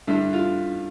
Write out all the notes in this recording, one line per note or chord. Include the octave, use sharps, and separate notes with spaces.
G2 D3 E4
F4